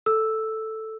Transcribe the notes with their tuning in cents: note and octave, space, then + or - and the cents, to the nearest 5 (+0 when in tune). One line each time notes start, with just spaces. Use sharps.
A4 +0 E6 +0